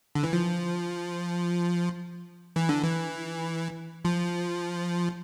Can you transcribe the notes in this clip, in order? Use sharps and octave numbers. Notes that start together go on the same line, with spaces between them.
D3
E3
F3
E3
D3
E3
F3